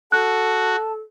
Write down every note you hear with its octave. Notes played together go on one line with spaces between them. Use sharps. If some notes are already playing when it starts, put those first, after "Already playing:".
F#4 A4 A5 F#6